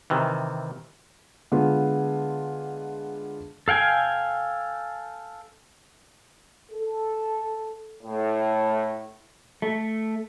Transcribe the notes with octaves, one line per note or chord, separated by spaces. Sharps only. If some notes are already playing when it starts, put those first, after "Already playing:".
C3 D#3 E3
D3 G#3 B3 F4 G#4
A4 F5 G5 G#5
A4
A2
A3